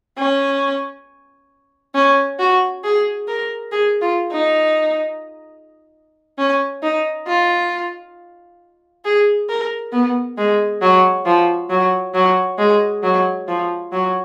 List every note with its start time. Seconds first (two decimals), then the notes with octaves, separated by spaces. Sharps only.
0.18 C#4
1.95 C#4
2.39 F#4
2.84 G#4
3.28 A#4
3.72 G#4
4.02 F4
4.31 D#4
6.38 C#4
6.83 D#4
7.27 F4
9.05 G#4
9.49 A#4
9.92 B3
10.38 G#3
10.82 F#3
11.26 F3
11.70 F#3
12.14 F#3
12.58 G#3
13.03 F#3
13.48 F3
13.92 F#3